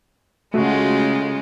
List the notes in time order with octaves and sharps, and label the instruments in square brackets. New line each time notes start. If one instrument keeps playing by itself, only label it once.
[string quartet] C#3 G#3 F4 [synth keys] A3 F#4